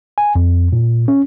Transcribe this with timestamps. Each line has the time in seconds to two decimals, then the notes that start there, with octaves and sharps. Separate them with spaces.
0.18 G#5
0.36 F2
0.73 A#2
1.08 C#4